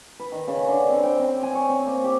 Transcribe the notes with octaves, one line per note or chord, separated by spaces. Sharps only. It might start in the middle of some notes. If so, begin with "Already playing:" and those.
B4
D#3
C#3
D3
C4
G5
C4
G#5
C#5
C4
A#3
G4